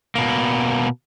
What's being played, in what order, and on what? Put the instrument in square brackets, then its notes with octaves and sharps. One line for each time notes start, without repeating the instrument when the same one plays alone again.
[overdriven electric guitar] B2 A#3